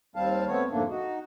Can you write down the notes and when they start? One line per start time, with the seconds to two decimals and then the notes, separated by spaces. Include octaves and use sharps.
0.16 D#2 G3 C4 F5 A5
0.48 A3 B3 C4 C#5
0.71 F2 G#2 D3 A3 A#3 D4
0.89 D#4 F#4